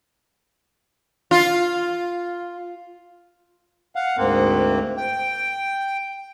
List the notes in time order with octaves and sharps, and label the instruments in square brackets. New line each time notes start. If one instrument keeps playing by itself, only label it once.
[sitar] F4
[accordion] F5 F#5
D2 G#2 A#3 C4
G5